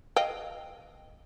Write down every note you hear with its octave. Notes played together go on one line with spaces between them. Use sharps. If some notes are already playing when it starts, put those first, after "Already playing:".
D#5 F5 G5